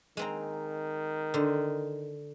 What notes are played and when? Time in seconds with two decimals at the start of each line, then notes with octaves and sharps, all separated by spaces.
0.17 D#3 G#3 C4 A#5
1.34 D3 C5